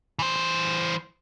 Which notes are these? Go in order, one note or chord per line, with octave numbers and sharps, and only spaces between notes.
E3 C5